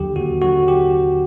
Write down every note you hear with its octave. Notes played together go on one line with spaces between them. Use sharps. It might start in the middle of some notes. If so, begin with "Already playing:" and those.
Already playing: D#2 D3 F#3 G4
D#2 F#4
D3 F#3 F#4
G4